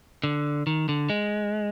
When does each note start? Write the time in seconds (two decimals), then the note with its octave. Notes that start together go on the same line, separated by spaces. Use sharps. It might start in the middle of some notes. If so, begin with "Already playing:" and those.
0.24 D3
0.67 D#3
0.89 D3
1.10 G#3